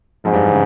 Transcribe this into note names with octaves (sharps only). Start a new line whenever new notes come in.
F2 G#2 F3
G2 G3
E3
C#3